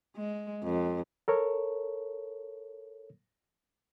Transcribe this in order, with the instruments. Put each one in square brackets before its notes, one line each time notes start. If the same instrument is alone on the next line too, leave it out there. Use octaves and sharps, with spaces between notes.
[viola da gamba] G#3
F2
[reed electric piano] A4 A#4 C#5